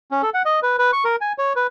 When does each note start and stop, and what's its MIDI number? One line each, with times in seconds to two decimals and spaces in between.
0.11 0.22 61
0.22 0.30 69
0.34 0.42 78
0.45 0.60 75
0.63 0.76 71
0.79 0.91 71
0.93 1.04 85
1.05 1.16 70
1.21 1.33 80
1.38 1.53 73
1.56 1.67 71